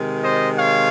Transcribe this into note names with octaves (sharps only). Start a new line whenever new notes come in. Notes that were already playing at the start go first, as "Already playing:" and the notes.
Already playing: C3 D#3 G#3
C5 D#5
C#5 F5